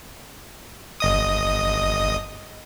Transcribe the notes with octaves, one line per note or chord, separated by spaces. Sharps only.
G1 D#5 D#6